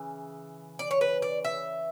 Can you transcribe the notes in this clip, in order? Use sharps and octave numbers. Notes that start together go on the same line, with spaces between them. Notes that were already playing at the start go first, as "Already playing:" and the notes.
Already playing: C#3 E3
D5
C#5
B4
D5
E5